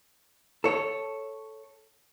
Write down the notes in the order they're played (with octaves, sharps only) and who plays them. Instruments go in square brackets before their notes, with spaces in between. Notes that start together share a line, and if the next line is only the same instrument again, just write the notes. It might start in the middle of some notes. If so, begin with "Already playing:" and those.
[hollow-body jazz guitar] A4 C#5